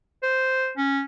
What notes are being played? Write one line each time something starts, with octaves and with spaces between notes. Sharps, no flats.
C5
C#4